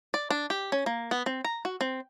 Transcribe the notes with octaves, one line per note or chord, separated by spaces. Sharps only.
D5
D4
G4
C#4
A#3
B3
C4
A#5
F#4
C4